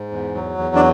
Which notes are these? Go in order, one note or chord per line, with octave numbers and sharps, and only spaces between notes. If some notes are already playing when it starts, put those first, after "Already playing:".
Already playing: G#2
E2
F#3
E2
D4